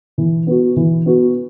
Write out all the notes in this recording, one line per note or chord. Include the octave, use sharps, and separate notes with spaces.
E3
B3 F#4
E3
B3 F#4